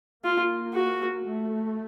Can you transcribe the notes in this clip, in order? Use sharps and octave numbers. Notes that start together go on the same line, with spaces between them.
A#3 F4
F#4
A3